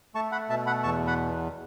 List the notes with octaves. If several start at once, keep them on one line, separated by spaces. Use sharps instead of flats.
A3 A5 C#6
F#5 B5
B2 E5 A5
F#5 B5
E2 A5 C#6
F#5 B5